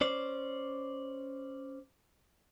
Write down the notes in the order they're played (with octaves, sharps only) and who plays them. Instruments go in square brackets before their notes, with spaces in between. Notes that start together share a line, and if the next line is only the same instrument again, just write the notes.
[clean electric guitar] C#4 C5 D5